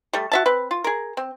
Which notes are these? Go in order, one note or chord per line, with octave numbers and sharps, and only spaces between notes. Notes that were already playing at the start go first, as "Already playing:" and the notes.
G3 A3
F#4 E5 A5
C4 B4
F4
G#4 A#4
C4